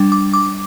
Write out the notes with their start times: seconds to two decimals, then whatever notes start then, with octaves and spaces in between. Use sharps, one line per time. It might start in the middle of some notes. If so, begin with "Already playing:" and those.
Already playing: G3 D4
0.12 D6
0.33 D6